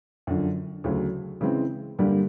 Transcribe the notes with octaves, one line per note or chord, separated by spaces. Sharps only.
F#2 D3 F3
D2 C#3 F#3
C#3 E3 G#3 C4
G2 D3 G3 A#3